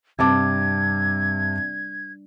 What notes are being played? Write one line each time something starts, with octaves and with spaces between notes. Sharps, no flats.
E2 G2 C3 A5 D6 G#6